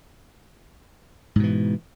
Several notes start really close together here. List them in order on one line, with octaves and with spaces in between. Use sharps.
G#2 B2 E3